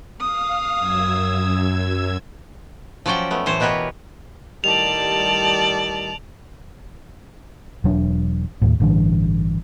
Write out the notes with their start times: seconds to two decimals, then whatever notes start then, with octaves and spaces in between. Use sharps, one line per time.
0.21 F5 D#6
0.78 F#2 E6 G#6
3.06 F3 F#3 C#4 D5 G5
3.31 A3 B3
3.46 A2 E3 C5 C#5
3.60 B2 B3 G4 A#4 B4 C#5
4.64 A2 D#3 G3 D5 A5 F7
7.84 E1 F#3 D4
8.62 D#2 A2
8.80 A1 G2 D3 E3